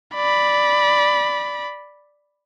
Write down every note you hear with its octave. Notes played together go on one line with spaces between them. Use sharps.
D5 B5